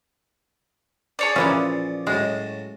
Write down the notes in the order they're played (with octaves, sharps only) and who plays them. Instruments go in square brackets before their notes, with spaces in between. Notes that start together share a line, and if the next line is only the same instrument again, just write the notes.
[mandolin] G#4 C#5 D5
[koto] A#2 E3 C#4 [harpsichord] F3
[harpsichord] A2 F#3 [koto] G#3